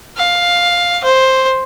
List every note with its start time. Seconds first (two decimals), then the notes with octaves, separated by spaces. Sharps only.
0.17 F5
1.04 C5